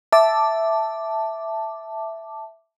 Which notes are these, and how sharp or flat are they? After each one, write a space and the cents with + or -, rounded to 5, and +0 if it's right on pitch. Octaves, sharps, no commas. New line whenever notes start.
E5 +0 A5 +0 D6 +0